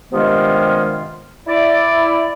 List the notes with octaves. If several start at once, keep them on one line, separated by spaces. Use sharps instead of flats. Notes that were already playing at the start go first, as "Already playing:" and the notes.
G2 C3 D#3 G#3 B3 F4
E4 D5